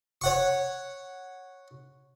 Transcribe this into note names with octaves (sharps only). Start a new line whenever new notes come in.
C#5 F#5 C#6